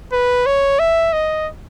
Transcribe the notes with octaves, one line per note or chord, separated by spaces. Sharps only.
B4
C#5
E5
D#5